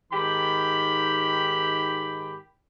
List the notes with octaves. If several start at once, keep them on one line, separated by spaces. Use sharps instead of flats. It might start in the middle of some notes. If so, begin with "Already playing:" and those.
G#2 D#3 G4 G5 B5